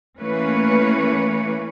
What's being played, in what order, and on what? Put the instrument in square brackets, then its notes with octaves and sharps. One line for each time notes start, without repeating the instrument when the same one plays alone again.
[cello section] E3 A3 A#3 C#4 B4 C#5